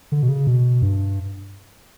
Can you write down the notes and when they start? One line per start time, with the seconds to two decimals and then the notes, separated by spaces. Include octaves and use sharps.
0.12 D3
0.23 B2
0.29 C#3
0.47 B2
0.82 G2